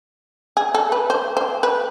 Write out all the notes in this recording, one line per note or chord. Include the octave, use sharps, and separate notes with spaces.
G#4
A4
B4
C5
C5
B4